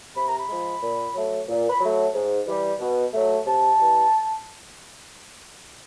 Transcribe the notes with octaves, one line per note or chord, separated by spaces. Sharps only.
C3 B5
A#5
B5
F3 G#3
A#2
F#3 A3
A#2
B5
F#3 A3
G#2
E3 G3
B2
F#3 A3
C3 A5
E3 G3